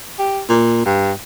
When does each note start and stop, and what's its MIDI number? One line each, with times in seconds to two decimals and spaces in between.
0.19 0.41 67
0.49 0.83 46
0.85 1.12 43